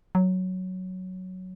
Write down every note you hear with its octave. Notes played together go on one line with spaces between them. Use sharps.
F#3